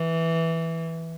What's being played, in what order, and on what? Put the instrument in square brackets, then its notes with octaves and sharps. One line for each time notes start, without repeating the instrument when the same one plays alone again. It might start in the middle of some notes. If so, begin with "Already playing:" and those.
Already playing: [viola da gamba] E3